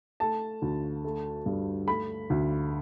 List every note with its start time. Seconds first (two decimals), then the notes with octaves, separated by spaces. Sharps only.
0.20 A3 A5
0.62 D2
1.05 A3
1.46 G2
1.88 A3 B5
2.30 D2